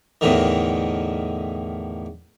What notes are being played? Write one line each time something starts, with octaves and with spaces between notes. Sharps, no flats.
E2 A2 D3 D#3